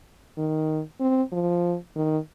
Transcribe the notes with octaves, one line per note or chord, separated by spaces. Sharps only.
D#3
C4
F3
D#3